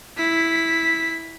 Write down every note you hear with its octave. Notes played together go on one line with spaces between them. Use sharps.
E4 B6